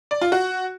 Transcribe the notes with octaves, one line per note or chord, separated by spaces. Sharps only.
D5
F4
F#4